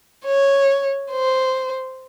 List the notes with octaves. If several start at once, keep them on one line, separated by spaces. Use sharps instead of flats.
C#5
C5